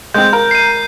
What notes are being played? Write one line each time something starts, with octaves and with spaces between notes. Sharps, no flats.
G#3 C4 G6
A#4
C7 D#7